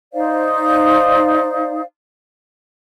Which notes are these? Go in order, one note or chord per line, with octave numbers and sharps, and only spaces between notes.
D#4 C5 D5 F5